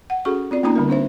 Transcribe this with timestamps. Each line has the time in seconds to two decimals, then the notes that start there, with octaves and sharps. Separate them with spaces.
0.10 F#5
0.25 C#4 F#4 G#4 A4 C#6
0.51 C4 F4 D5
0.63 A#3 B3 C#4 D#4 F4 A#5
0.75 D3 G3 A#4
0.88 C4 D4 C5 E5